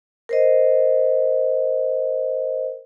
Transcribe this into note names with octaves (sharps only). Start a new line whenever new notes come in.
A#4 C5 D#5